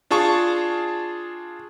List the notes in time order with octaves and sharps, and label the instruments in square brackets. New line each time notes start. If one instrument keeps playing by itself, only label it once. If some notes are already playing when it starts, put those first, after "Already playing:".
[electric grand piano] D4 F4 G#4 A5 C#6